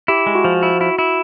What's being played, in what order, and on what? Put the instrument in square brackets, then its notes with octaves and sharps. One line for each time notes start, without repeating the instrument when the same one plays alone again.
[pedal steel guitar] E4 [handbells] G4
[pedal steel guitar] G#3
[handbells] F#4
[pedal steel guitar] F3
E4
E4
E4